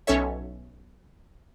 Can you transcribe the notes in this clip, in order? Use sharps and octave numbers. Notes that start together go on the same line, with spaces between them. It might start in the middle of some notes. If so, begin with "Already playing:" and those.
B1 C#4 A4 C#5 E5